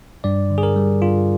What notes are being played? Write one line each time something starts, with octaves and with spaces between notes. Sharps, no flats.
G2 D5
D3
G#4
A#4
G3
G2 F4